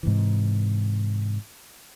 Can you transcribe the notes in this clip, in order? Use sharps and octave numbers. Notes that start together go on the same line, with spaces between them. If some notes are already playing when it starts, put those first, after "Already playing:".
G#2 C3 E3